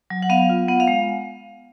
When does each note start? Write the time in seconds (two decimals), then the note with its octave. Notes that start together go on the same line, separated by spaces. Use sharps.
0.10 F#3
0.22 F#5
0.30 B3 F5
0.50 F4
0.68 B3 F#5
0.80 F5
0.88 G#3